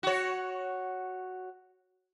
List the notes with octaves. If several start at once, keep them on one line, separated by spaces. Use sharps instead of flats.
F#4 C#5